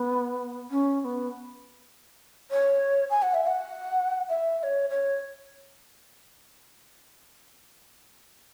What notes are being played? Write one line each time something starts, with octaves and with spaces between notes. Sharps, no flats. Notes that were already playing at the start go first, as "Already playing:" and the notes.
Already playing: B3
C#4
C#4
B3
C#5
G#5
F#5
E5
F#5
E5
E5
C#5
C#5